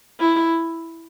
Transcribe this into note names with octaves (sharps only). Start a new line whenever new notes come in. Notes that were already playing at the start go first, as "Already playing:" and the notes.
E4